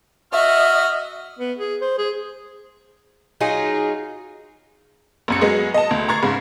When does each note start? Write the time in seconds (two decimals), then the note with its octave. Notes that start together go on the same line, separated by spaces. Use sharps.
0.32 F#4 D#5 E5 F6
1.39 B3
1.58 G#4
1.81 C5
1.98 G#4
3.41 F#3 D#4 F4 G#4
5.28 A#1 F#2 C#7
5.41 F#3 G#3 B3 G#4
5.74 D#5 A5
5.91 D2
6.08 A#5 C#6 G#6 A6 C7
6.23 G#2 C#3